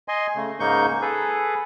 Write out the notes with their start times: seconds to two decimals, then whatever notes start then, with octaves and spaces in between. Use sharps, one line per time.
0.08 D#5 G#5 C6
0.36 C#3 A3
0.60 G#2 C#3 A#3 D#4 C#6 G6
1.01 G#4 A4 B4